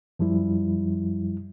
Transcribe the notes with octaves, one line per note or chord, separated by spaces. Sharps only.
F#2 F3 G3 E4